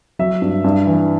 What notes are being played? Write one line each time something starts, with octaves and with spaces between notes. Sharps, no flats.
F#3 E5
G2
G2
E3